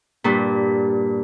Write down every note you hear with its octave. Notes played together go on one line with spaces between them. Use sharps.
G2 A#2